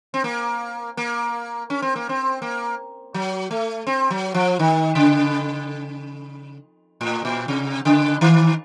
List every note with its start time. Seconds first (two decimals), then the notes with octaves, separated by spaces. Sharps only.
0.14 C4
0.24 A#3
0.97 A#3
1.70 C#4
1.82 C4
1.96 A#3
2.09 C4
2.42 A#3
3.14 F#3
3.51 A3
3.87 C4
4.10 F#3
4.34 F3
4.59 D#3
4.95 C#3
7.01 A2
7.25 A#2
7.48 C3
7.85 C#3
8.21 D#3